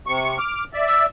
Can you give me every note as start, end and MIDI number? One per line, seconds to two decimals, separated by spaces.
0.07 0.38 48
0.07 0.38 85
0.38 0.64 86
0.38 0.64 89
0.73 1.06 74
0.73 1.06 76
0.88 1.04 88